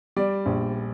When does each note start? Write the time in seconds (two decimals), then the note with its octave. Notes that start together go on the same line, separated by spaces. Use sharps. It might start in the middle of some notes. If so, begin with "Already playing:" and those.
0.16 G3 D5
0.46 A#1